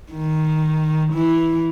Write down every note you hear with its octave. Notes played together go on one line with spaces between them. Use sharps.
D#3
E3